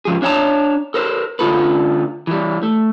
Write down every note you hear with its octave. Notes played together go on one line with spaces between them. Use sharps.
G#2 F3 G#4
D4 C#5 F5 G5 A5 A#5
A4 A#4 C5
D2 D3 F4 A4 B4
E3 G3
A3